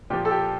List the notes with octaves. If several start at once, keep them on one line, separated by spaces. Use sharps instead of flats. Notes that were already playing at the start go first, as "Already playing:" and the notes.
A#2 F3 G4
A4
G4